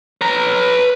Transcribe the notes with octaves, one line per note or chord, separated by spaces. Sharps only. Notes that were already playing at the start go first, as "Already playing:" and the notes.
B4 A#5